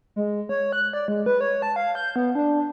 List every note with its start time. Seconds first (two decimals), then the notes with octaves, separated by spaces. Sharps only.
0.16 G#3
0.49 C#5
0.73 F#6
0.93 D5
1.08 G#3
1.26 B4
1.41 C#5
1.62 A5
1.76 F5
1.95 G6
2.16 B3
2.35 D4